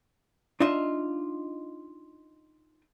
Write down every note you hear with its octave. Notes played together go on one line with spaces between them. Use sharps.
D4 D#4 F4 D#5 E5